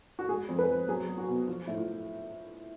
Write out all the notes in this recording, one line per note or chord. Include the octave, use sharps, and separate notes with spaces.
F#4
G#3 G#4
F2
B4
F2
F#3 G#4
F#3
F#4
B2
F3 F4
A2
F4